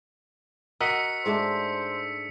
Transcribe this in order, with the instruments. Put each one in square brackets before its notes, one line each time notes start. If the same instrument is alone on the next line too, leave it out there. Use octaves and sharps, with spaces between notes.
[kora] F#4 [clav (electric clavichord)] A#4 D#5 F#5 [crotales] E6 B6 C#7
[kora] G#2 A3 D4 [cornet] C5